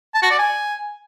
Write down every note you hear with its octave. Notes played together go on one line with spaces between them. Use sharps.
A5
F#4
D5
G#5